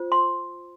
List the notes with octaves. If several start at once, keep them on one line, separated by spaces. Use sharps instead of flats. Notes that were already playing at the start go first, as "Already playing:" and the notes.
Already playing: F4 C5
C6